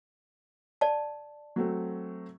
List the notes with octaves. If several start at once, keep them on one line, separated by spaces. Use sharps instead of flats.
D5 A5
F#3 A3 C4